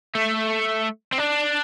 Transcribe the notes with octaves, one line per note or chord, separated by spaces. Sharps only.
A3
C4
D4